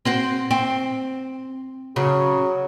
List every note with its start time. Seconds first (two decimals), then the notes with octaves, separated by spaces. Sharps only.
0.05 C4 F#4 C5
0.51 C4
1.96 C#3 F#3